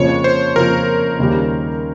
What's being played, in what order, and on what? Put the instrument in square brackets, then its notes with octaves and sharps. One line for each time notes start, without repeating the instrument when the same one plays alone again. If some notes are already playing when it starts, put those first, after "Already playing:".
Already playing: [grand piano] F2 C#3 F3 A#3 F4 [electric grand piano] C#5
[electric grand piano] C5
[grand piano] F2 C#3 F3 A#3 F4 [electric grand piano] A#4
[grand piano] D#2 C#3 G3 C#4 G4